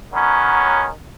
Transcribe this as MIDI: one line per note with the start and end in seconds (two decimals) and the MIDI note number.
0.14 0.88 51
0.14 0.88 54
0.14 0.88 59
0.14 0.88 61